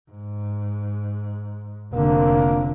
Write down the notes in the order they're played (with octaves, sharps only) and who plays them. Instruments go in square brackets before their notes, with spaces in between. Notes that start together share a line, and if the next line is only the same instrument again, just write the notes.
[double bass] G#2
[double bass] F1 D3 [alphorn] A#3